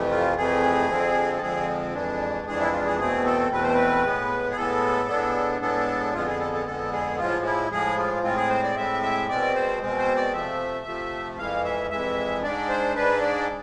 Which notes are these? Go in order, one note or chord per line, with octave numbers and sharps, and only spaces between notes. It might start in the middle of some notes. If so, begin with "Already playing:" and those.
Already playing: F2 C3 E3 A3
F4
F2 C3 E3 A3 G#4
F2 D3 F3 G#3 C4
A4
F2 D3 F3 G#3 C4 G#4
F2 E3 G#3 D4
F2 E3 G#3 D4 G#4
E4
F4
G#4
E2 B2 A3 C4 G#4
A4
E2 B2 A3 C4 B4
C5
B4
A2 G#3 B3
G#4
A2 G#3 B3 A4
A2 G#3 B3 D4
A2 G#3 B3 D4 A4
F2 D3 G#3 B3 F4
G#4
A4
A4
F2 D3 G#3 B3 A4
G#4
A2 F3 G#3 F4
E4
A2 F3 G#3 G#4
F4
A2 G#3 C4 F4
G#4
C5
D5
A2 G#3 C4 E5
E5
B2 G#3 C4 D5
C5
B2 G#3 C4
C5
D5
C3 F3 A3 E5
C3 F3 A3
F2 E3 G#3 F5
E5
F2 E3 G#3 E5
G#2 G#3 D4 D5
C5
G#2 G#3 D4 B4
D5